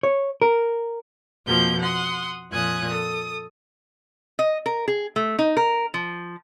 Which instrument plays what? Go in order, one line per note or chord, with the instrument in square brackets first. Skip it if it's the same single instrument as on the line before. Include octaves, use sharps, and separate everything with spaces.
[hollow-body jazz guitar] C#5
A#4
[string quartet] F2 B2 F3 A#3 G6
F#5 C6 D#6
F2 A#2 G#5 D#6 F#6
A4 D#6
[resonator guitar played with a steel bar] D#5
A#4
G#4
A3
D#4
A#4
F3